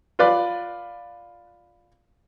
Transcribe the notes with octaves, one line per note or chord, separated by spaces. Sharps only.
F4 B4 D5